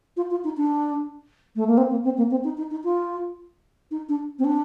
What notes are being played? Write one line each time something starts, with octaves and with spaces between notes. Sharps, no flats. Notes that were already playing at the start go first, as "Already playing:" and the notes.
F4
F4
D#4
D4
A3
A#3
C4
A#3
C4
A#3
C4
D#4
D#4
D#4
F4
D#4
D4
C4
D4